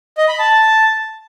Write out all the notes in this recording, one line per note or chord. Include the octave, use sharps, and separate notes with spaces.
D#5
B5
A5